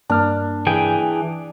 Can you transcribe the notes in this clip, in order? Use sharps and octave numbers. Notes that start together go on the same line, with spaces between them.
G2 A#3 D4 F6
E3 G#4 G5